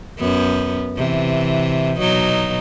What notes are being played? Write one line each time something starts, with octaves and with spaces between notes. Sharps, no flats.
F#2 B3
C3 E3
B2 F#3 D#4